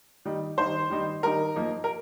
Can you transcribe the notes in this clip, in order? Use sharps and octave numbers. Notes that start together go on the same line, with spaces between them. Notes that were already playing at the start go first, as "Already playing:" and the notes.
D#3 G3 D#4
D#3 G3 D#4 C5
D#3 G3 D#4
D#3 G3 D#4 A#4
F3 A#3 D#4
A#4